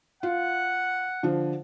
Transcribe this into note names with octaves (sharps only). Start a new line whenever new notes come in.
F4 F#5
D3 F3